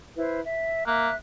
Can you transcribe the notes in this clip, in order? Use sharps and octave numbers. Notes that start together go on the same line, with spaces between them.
E4 B4 C5
E5
A#3 E5 F#6